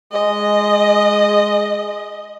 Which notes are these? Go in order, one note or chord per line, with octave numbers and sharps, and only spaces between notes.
G#3 D#5